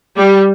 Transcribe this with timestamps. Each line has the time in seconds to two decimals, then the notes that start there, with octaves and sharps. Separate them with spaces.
0.17 G3